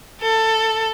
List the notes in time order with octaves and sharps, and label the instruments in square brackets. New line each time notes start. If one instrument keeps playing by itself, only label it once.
[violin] A4